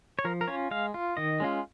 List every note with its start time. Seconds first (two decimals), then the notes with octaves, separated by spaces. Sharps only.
0.19 C#5
0.25 F3 A#4
0.41 A#4
0.48 C#4 F4 C#5
0.71 G#3 F5
0.94 F4
1.17 D#3 D#5
1.40 G#3 C#4 F4